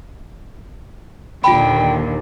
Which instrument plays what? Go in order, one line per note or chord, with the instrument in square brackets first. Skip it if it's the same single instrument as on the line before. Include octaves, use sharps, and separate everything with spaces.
[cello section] D#2 [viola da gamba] A#2 D3 [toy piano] F4 B5 [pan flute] G5